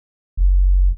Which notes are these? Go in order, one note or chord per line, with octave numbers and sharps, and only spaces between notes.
F#1